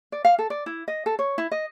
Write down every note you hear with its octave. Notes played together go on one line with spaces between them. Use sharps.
D5
F5
A4
D5
E4
D#5
A4
C#5
E4
D#5